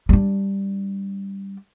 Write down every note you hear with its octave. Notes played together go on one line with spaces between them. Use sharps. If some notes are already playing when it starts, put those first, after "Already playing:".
G3 D4